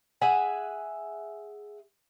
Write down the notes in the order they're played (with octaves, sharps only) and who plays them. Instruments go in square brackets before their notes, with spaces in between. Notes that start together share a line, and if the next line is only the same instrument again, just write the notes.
[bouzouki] G#4 E5 F#5 G#5